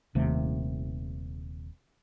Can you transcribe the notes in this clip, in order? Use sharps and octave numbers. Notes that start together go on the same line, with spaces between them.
D#1 D#2 C3 A3